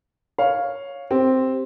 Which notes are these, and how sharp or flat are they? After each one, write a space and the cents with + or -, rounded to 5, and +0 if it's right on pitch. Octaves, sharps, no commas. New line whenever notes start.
C#5 +0 F5 +5
C4 +0 G4 +0